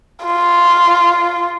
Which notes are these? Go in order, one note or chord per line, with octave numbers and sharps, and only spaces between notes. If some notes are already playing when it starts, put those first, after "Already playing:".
F4